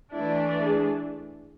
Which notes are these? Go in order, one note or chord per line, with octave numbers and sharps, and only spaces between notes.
E3 A3 D4 E4
G#4